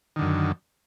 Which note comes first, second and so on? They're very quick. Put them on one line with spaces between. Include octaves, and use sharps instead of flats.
D#3 D3 F#2